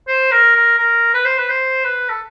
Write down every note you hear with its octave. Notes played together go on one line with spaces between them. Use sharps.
C5
A#4
A#4
A#4
B4
C5
B4
C5
B4
A4